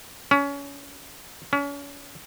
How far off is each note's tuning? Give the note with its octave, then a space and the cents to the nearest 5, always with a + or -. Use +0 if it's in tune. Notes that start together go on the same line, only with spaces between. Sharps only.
C#4 +25
C#4 +35